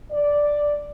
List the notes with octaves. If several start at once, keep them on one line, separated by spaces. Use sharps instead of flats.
D5